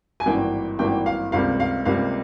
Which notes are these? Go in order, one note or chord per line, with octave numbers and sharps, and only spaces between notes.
G#5
G#1 G2 E3 A#3 G5
G#1 G2 E3 A#3 G5
F5
C#2 C3 G3 A#3 F5
F5
C#2 C3 G3 A#3 F5